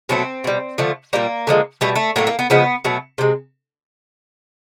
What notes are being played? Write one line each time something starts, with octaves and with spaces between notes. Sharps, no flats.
B2 F#3 A3 C4
B2 G3
D3 F3 A3
A#2 G3 A#3
D3 F3 G#3
B2 G3 A3
A3
A2 F#3 A3 A#3
A#3
B3
C#3 F3 G#3 B3
B2 F#3 A3
C3 F3 G#3